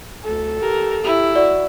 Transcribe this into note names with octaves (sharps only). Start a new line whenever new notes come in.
D2 A4
G4 A#4
E4 G4
F#4 D5